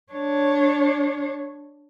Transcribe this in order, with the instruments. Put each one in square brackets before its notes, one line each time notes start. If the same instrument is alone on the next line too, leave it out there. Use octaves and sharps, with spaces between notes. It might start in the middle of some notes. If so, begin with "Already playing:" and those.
[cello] D4 C#5